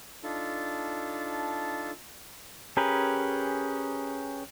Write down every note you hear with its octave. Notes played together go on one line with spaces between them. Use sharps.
D4 D#4 F4 A4 A5
C#4 G4 G#4 A#4 B4